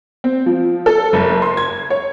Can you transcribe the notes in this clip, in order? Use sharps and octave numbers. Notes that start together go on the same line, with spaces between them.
C4
F3
A4
F#1
C6
G#6
C#5